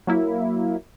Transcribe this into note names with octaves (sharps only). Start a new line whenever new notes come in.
F#3 A#3 E4